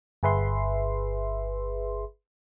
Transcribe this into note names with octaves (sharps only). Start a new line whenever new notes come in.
G1 G#4 B4 E5 C6